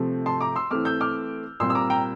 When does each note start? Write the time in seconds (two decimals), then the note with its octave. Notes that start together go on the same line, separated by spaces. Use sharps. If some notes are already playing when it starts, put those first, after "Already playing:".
Already playing: C3 F3 A3 C4
0.26 A5 C6
0.41 A#5 D6
0.56 C6 E6
0.71 E3 A3 C4 D6 F6
0.85 E6 G6
1.01 D6 F6
1.60 A#2 G3 C4 C6 E6
1.70 E6
1.75 A#5 D6
1.90 G5 A#5